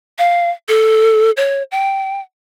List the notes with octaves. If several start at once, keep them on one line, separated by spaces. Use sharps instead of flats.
F5
A4
C#5
G5